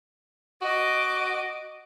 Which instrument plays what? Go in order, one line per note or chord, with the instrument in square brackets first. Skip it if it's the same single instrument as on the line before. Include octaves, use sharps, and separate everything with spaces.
[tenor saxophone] F#4 [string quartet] D#5 D6